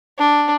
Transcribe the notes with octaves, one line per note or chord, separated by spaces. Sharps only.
D4